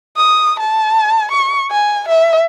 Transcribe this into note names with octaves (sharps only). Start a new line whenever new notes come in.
D#6
A5
C#6
G#5
E5